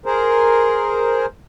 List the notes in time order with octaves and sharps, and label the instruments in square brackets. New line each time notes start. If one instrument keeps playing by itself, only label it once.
[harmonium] G#4 A#4 C5